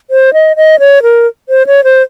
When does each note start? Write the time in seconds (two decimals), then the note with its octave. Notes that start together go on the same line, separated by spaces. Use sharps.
0.10 C5
0.33 D#5
0.56 D#5
0.79 C#5
1.03 A#4
1.49 C5
1.67 C#5
1.84 C5